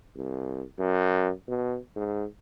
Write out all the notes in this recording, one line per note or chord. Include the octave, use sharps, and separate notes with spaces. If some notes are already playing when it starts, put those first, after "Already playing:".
C2
F#2
B2
G#2